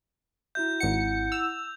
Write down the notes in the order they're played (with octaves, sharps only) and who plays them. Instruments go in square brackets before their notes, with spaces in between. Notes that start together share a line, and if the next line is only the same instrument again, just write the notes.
[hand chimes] E4 F#4 E5 [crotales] G6
[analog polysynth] G#1 C#7 [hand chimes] E4 F#5
[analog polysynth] E6 [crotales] F7